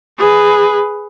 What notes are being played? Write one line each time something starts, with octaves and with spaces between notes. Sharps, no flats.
G#4 B4